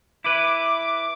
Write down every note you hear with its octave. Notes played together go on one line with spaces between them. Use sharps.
E4 B4 D6